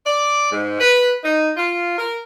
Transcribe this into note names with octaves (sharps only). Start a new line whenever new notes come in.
D5
G#2
B4
D#4
F4
A#4